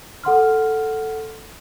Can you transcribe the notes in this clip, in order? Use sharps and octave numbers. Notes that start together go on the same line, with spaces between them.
A4 F#5 C6 F6